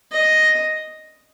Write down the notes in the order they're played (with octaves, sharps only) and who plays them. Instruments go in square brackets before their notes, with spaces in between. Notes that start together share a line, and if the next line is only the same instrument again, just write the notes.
[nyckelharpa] D#5